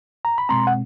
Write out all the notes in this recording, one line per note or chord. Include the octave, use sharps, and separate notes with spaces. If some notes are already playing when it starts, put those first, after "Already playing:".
A#5
B5
B2 G#3 C4 A#5 C6
F#5